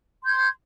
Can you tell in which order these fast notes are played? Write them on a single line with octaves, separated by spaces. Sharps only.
C6 G6 G#6